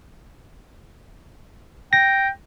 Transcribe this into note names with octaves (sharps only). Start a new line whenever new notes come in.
G5 A#6